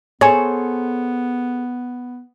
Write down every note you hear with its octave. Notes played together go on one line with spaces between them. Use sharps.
B3 G#4 A4 C5 C#5 G#5 C#6